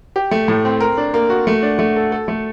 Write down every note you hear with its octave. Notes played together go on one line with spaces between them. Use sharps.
G4
A3
A2
C4
A#4
D4
A#3
F#4
A3
D4
A3
A4
A4
A3